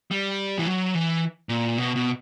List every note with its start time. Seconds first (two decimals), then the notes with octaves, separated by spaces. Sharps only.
0.11 G3
0.58 E3
0.67 F#3
0.94 E3
1.49 A#2
1.78 B2
1.96 B2